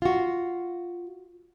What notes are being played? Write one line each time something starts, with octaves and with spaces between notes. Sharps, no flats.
F4 F#4